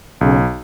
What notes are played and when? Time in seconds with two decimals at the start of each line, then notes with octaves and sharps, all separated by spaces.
0.21 B1 C#3